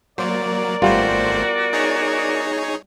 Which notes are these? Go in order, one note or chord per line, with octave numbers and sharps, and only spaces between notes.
F#3 A#3 A#4 C5 D5
G#1 G3 A3 B3 F4 F#4 C5
D#4 G#4 C#5